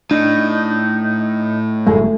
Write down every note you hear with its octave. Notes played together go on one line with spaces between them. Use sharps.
A2 D4 D#4
G1 F#2 G#3 A3